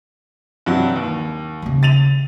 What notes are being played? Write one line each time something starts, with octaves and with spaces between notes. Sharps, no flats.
G2 C3 F#3
D#2
D#2 C#3
A6 D#7 F7